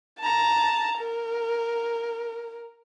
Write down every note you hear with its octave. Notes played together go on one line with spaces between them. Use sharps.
A5 A#5
A#4